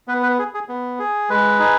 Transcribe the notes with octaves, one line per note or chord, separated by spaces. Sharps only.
B3 B4
B4
G#4
G#4
B3
G#4
G#3 B4
D#4 G#4